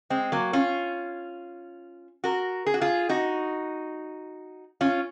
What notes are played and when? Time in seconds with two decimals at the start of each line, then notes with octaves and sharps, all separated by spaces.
0.10 G#3 C4
0.32 F#3 A#3
0.53 C#4 F4
2.24 F#4 A#4
2.66 G#4
2.74 F#4
2.81 F4 G#4
3.09 D#4 F#4
4.81 C#4 F4